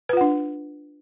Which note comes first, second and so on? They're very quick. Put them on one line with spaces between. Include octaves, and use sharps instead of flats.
B4 F4 F#5 D4